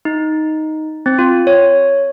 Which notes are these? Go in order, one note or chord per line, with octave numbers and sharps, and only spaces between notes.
D#4
C4
F4
C#5